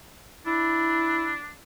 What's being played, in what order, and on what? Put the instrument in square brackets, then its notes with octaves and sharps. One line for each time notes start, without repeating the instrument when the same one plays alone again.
[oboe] D4 [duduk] E4